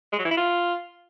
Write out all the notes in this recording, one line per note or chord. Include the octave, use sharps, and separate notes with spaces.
G#3
F#3
E3
E4
F4